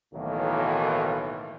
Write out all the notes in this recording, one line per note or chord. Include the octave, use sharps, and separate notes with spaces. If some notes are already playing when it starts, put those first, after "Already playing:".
B1 A2 D#3 E3 F#3 A#3